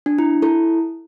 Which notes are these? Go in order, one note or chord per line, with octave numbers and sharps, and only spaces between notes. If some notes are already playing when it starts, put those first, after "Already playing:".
D4
E4
E4 A4